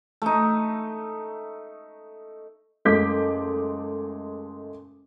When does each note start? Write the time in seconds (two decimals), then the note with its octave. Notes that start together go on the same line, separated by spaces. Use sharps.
0.22 A3 D#4
2.85 F#1 G#3 A3 D6 G6 B6